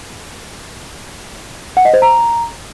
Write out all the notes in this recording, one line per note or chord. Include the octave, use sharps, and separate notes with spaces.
F#5
D#5
C5
A#5